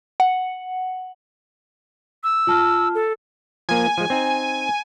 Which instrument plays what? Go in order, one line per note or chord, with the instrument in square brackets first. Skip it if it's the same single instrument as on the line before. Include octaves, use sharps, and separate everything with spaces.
[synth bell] F#5
[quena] E6
[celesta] F4 A5 F6
[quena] A4
[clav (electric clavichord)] F3 A#3 [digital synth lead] G#5
[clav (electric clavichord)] F3 G#3
C4 D#4